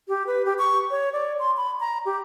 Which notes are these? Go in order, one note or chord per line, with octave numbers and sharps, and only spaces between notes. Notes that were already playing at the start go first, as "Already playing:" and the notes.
G4
B4
G4
C#6
C#5
D5
C6
B5
A#5
G4